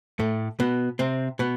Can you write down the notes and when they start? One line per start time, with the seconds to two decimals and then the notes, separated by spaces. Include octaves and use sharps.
0.19 A2 A3
0.60 B2 B3
0.99 C3 C4
1.39 B2 B3